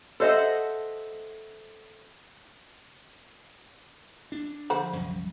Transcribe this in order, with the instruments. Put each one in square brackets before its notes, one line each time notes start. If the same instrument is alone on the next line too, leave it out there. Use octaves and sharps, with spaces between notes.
[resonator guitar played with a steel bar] A4 C5 D#5 E5 F#5
[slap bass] D4
[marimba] D3 F3 [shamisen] C5 F#5 B5
[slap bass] C2 F#2 [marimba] F3 G3